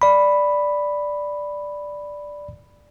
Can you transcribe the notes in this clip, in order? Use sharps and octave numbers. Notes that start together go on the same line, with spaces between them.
D5 B5